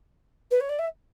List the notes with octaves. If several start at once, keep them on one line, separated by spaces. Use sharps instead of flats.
B4
C#5
D5
E5